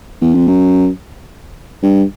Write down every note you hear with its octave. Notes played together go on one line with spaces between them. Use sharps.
E2
F2
F#2
G2